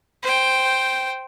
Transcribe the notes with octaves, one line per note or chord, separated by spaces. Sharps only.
C5 G5